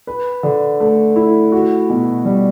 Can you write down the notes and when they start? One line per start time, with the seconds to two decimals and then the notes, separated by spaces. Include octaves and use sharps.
0.07 B4
0.43 D3
0.80 A3
1.16 E4
1.52 F#4
1.89 B2
2.25 G3